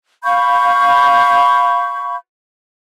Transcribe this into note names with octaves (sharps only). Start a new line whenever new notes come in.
F5 B5 C#6 G6